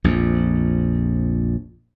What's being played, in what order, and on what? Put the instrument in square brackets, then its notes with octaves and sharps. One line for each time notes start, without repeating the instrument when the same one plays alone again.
[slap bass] A#1 F2